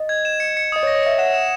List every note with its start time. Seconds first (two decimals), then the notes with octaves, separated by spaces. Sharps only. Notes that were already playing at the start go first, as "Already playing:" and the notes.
Already playing: D#5
0.09 G#6
0.25 E7
0.40 C#7
0.57 C#7
0.72 D#5 D#6
0.83 C#5
0.87 A#6
0.95 C#5
1.03 E5 C#7
1.18 F#5 E7
1.34 E7